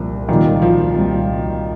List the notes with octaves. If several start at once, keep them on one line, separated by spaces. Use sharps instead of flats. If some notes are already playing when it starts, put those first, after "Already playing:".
Already playing: C2 A#2 F3
C2 A#2 D#3 F3
F3
C2 A#2 F3